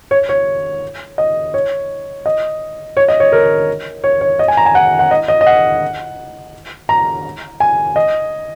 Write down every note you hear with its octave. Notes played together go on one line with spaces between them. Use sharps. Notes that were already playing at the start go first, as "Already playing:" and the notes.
C#5
C#5
D#5
C#5
D#5
C#5
D#5
C#5
A#4
C#5
C#5
D#5
G#5
A#5
G#5
F#5
F#5
D#5
D#5
D#5
F#5
A#5
G#5
D#5